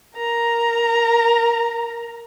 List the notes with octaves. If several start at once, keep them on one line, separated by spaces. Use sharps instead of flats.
A#4 A#5